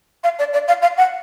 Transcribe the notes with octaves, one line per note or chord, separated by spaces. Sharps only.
F5
D5
D5
F5
F5
F#5